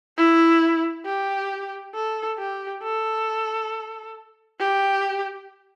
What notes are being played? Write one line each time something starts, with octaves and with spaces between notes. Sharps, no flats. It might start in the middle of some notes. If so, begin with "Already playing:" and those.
E4
G4
A4
G4
A4
G4